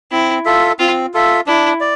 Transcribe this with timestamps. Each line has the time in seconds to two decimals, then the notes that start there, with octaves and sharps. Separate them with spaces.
0.12 C4 E4
0.45 F4 A4 E5
0.79 C4 F4
1.14 F4 A4 E5
1.46 D4 E4
1.81 D5